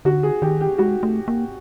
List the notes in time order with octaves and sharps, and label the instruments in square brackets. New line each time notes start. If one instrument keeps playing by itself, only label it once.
[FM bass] D3 [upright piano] F#4
[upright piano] G#4
[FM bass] D#3 [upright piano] G4
[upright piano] G4
[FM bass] G#3 [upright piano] F#4
[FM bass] A3
A#3